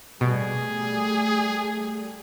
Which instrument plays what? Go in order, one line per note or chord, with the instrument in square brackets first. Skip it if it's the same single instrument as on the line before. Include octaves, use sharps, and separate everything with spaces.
[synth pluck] B2 [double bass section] G3 A3 [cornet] G#4